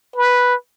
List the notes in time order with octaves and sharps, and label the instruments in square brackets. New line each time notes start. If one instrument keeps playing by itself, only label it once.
[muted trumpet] B4